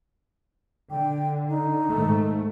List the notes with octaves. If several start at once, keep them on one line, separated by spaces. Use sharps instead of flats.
D3 G5
D#4
G#2 D#3 A3